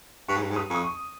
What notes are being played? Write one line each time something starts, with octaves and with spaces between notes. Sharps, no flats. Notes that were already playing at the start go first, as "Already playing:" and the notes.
G2 C#6
G#2
G2
G#2
G2 D#6
F2 D#6
C#6